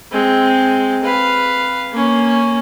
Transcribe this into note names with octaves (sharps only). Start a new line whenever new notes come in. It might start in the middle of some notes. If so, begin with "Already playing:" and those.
G#3 C4
B4 F5
A#3 C#4